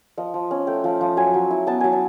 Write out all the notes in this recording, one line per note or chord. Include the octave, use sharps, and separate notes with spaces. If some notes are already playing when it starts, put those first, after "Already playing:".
F3 D#5
F3
C#4
A3 G5
F3
F3
F#3 G#5
F#3
E4
B3 A5
F#3 G#5
A5